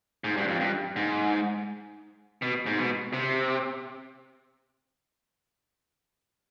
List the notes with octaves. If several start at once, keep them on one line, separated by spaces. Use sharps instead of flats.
G#2
G2
F2
G2
G#2
B2
G#2
B2
C3